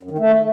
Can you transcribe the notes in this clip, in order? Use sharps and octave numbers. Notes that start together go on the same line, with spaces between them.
F#2
D#3
A3